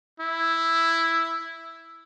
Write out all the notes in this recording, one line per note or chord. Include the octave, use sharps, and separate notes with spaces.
E4